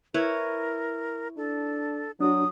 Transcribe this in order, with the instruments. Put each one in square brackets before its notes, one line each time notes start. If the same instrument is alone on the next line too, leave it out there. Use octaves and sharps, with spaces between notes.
[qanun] E4 B4 C#5 [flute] A#4
[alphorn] D4 [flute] A4
[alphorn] F#3 [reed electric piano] D4 F#4 [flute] D#6